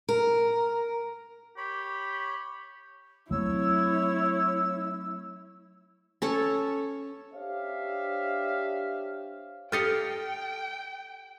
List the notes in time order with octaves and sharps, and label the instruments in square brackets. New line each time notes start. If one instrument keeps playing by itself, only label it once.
[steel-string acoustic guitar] A#4
[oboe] G4 [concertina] C#5 B5
[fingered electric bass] F#3 A3 C4 [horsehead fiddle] E4 [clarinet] C#5 [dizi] E6
[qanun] C#4 A4 C#5
[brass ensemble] D4 G4 C5 C#5 E5 F5
[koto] G4 D#5 F5 [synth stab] A4 [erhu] G5 [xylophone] F6 A6 C#7